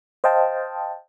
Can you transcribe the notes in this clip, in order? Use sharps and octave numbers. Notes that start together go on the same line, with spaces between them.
C5 D#5 F5 G5 A5